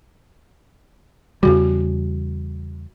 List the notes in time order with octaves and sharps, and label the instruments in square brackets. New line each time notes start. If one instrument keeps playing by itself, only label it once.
[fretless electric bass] E2 C#3 G3 [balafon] F#4